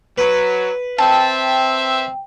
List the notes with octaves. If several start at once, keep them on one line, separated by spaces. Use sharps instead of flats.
F#3 B4
C4 E5 G5 A5